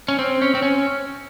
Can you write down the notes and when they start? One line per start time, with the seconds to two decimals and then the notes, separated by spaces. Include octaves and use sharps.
0.08 C#4
0.19 C4
0.42 C#4
0.55 C4
0.62 C#4